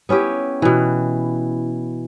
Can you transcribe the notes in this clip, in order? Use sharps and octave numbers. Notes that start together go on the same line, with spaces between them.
B3 C#4 E4 G4
B2 E3